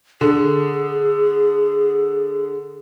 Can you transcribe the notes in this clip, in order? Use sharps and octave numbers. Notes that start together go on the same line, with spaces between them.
D3 G#4